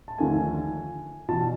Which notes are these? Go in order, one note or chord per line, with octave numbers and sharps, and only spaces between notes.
A5
D#2 D3 F3 A3 G#5
E2 B2 A5